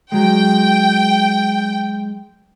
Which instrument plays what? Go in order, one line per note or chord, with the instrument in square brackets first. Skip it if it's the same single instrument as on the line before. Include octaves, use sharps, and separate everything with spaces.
[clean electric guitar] F#3 G#3 [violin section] G5